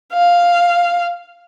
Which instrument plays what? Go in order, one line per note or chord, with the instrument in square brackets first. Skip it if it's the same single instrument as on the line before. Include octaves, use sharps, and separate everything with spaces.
[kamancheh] F5